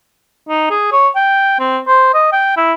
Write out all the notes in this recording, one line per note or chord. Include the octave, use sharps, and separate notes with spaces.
D#4
G#4
C#5
G5
C4
C5
D#5
G5
E4